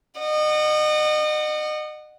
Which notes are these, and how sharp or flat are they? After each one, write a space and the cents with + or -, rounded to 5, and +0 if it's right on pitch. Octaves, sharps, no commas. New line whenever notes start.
D#5 -35 F#5 +0